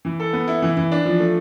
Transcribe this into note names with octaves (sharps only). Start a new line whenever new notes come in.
E3
A4
B3
E4
E3
E3
D4
F3
A3